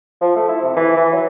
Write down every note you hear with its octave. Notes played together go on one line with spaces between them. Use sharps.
F3
A3
E4
C3
E3
E3
F#3